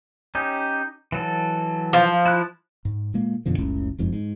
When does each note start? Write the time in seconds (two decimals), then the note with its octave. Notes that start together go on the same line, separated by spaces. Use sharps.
0.35 C#4 D#4 G4
1.12 E3 F#3 A4
1.93 F3
2.26 E4 F#6
2.85 G#2
3.14 A#2 G#3 A#3
3.46 F#2 B2 D3 F3
3.58 F#1 C#2 A2 C#4
3.99 F#1 F2 G#2
4.13 G#2